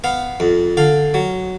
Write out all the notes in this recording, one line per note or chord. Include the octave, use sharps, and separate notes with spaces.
B3 F5
F2
D3 F5
F#3